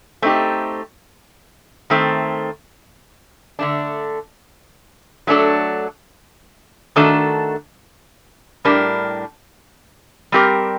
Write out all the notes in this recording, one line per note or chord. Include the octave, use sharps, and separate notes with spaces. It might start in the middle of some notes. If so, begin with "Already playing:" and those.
A3 C4 D#4 G4
D#3 A3 C4
D3 A3 D4
F#3 A3 D4 A4
D#3 A3 D4 F#4 A4
A2 G3 D4 G4 A#4
G3 C4 G4 A#4